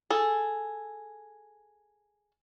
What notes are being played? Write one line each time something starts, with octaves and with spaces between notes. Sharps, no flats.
G#4 A4